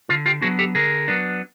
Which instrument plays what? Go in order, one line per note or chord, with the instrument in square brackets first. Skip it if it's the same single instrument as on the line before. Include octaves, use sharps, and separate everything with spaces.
[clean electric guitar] D3 F4
F4 G4
F#3 B3 D4 F#4 G#4
G4 A4
D3 G#4 A#4
F#3 B3 D4